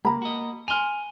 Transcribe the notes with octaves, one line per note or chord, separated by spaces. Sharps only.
C#2 A#3 A#5 B5
F#4 D#5
G#5 C6 F6 F7